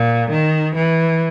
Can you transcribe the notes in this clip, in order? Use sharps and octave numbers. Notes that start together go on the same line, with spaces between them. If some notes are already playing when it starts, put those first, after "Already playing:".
Already playing: A#2
D#3
E3